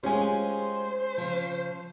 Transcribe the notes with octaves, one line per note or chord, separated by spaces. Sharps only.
G#3 C#4 F4 G4 C5 G#5
C#3 F3